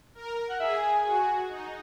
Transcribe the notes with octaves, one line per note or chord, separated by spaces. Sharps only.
A#4
F#5
G#4 E5
G#5
F#4 G#5
D#4